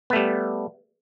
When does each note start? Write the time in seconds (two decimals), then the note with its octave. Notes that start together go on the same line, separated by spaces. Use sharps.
0.10 B3
0.13 A3
0.16 G3